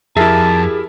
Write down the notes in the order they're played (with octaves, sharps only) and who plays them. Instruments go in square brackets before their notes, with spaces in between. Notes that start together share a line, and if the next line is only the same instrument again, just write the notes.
[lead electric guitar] F2 [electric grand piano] E4 A#4 E5 [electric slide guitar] G4 G#4 [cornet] A5